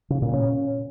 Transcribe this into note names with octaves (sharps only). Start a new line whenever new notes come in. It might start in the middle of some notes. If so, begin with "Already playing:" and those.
C#3
A#2
C#4